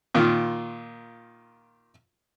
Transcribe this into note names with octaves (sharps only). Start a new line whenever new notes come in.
A#2 D#3 F4